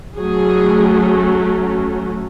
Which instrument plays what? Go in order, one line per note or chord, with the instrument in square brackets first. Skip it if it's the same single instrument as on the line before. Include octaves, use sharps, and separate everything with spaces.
[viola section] F#3 A3 C#4 G#4